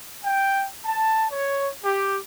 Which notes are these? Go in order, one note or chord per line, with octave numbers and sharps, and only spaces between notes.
G5
A5
C#5
G4